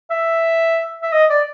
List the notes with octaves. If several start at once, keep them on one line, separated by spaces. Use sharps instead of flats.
E5
E5
D#5
D5